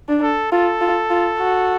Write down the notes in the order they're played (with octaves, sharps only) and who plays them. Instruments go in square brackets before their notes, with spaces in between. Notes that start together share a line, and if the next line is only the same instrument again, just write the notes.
[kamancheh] D4
[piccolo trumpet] A4
[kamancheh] F4 [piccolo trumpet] A4
[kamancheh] F4
F4
F#4